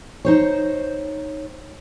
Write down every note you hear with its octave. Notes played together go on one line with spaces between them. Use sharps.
D#4 C5 C#5